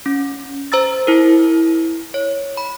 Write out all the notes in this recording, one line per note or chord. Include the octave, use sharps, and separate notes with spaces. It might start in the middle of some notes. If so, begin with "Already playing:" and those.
C#4
C5 A#5 E6 A6
E4 A#4
C#5
B5